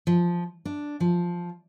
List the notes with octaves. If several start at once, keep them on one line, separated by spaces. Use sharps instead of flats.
F3
D4
F3